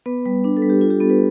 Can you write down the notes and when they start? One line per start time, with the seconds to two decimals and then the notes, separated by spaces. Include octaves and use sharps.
0.06 B3 B4
0.26 G3
0.44 D4
0.57 A4
0.62 G3
0.70 G4
0.81 F4 A4
0.90 G4
1.00 B3 A4
1.10 B4